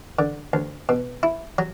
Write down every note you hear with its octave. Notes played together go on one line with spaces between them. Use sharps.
D3
D2
B2
E4
F#3